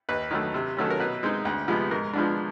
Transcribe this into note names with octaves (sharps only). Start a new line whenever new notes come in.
D#2 B4
D#3 F#3 A3
C3
D#3 F#3 A3 C#4 A4
A#4
B2 B4
G#3 C4 D#4
D2
C3 F3 G#3 B3
G#2 A#4
F3 G#3 B3 D4